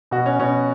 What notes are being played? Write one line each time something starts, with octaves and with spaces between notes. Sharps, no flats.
B2 F#4
C#4
B2 C#4